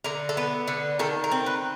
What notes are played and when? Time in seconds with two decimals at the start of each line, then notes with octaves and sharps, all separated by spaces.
0.04 D3 A#4
0.29 A4
0.37 B3
0.68 D3
0.99 D#3 A4
1.24 A#4
1.32 C4
1.46 B4